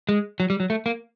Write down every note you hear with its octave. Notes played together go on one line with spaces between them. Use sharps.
G#3
F#3
G3
F#3
A3
A#3